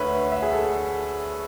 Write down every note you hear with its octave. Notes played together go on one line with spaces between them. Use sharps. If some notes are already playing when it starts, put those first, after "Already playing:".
Already playing: D2 D3 B4 C#5 E5
E5
G#4
A4